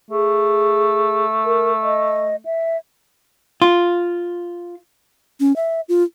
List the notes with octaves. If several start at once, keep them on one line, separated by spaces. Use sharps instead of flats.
A3 G#4
A#4
D#5
E5
F4
C#4
E5
F4